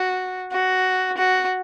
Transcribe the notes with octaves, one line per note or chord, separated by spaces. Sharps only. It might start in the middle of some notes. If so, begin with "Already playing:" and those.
Already playing: F#4
F#4
F#4